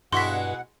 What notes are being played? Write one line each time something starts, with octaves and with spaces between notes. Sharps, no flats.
G2 B2 G#3 E4 F#4 F#5 C6 B6